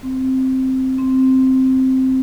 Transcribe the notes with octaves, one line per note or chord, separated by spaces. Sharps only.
C4
C4